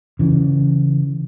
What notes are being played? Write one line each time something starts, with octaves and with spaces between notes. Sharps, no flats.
C#3 E3